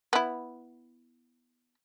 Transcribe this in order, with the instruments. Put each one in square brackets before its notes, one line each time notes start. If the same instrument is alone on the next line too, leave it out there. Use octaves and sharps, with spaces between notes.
[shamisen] B3 E4